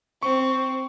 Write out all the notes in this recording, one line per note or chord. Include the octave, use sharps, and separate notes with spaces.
C4 C#6